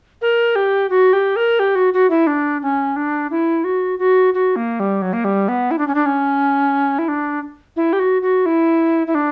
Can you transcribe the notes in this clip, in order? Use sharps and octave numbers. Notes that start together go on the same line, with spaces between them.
A#4
G4
F#4
G4
A#4
G4
F#4
F#4
E4
D4
C#4
D4
E4
F#4
F#4
F#4
A#3
G3
F#3
A#3
G3
B3
E4
D4
C#4
D4
C#4
E4
D4
E4
G4
F#4
F#4
E4
E4
D4